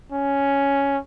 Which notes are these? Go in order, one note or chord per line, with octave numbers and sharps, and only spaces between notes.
C#4